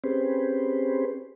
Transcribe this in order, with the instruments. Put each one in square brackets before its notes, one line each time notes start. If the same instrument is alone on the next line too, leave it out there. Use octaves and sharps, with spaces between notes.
[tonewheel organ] C4 C#4 G4 G#4 B4 C5